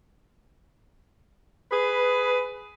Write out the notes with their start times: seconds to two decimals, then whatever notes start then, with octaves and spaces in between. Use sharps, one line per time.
1.71 G#4 B4